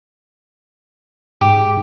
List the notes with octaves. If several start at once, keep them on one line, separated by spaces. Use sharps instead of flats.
G#2 G4